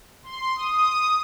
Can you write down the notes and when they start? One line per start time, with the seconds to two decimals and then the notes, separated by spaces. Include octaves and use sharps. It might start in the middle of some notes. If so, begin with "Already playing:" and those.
0.23 C6
0.56 D#6